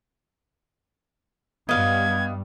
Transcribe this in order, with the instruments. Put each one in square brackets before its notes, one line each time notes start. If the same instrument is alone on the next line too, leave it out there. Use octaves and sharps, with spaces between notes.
[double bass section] G2 G3 [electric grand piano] B3 [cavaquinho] D#5 F5 [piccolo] G#6